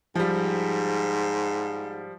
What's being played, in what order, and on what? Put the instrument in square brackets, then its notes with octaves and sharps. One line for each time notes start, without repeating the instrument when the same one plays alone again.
[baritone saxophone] G#2 [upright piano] F3 G3